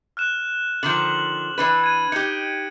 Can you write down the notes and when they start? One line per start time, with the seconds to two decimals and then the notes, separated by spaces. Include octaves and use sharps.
0.17 F6 F#6 E7
0.83 D3 D#3 F3 F#7
1.58 E3 D4 B4
1.84 G#6 D#7
2.12 D#4 G4 C#7